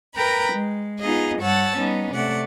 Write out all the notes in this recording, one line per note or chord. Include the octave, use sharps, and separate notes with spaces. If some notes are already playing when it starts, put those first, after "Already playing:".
A#4 B4 G5 A#5 B5
G#3
B3 D#4 F4 G#4 D#5
G2 G3 C#5 F#5 A5 E6
G3 B3 C#4 D#4
C3 A3 D5 F#5